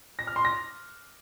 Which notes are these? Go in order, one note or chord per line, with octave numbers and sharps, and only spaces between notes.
A#6
F6
C6
A#6